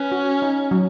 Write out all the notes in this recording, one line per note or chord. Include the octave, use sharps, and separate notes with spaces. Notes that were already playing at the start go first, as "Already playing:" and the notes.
Already playing: C#4 B4
F#4
D#4
F#3